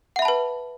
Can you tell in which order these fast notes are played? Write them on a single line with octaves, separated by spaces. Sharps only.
F#5 E5 B5 A5 B4